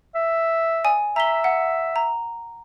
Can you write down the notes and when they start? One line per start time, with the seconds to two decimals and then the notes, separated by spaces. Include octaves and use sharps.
0.15 E5
0.84 D5 G#5 D#6
1.16 E5 A#5 B6 G7
1.44 F#5
1.96 A#5